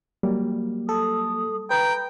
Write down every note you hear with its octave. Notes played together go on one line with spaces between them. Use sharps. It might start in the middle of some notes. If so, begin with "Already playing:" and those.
F#3 G3 A#3
A4 D#6
B4 G5 A#5